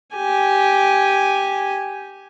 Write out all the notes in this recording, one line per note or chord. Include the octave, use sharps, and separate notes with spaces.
G4 G#5